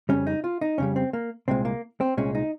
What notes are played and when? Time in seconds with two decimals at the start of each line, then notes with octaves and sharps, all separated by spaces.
0.09 F2 C#3 G3 C#4
0.27 D#4
0.44 F4
0.61 D#4
0.78 F2 C#3 G3 C#4
0.96 C4
1.13 A#3
1.48 C2 A#2 G#3 C4
1.65 A#3
2.01 C4
2.17 C2 A#2 G#3 C#4
2.35 D#4